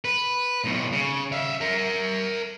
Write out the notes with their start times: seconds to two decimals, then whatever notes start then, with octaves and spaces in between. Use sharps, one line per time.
0.05 B4
0.64 B1 A2
0.92 C#3
1.32 E5 F5
1.61 A#4 E5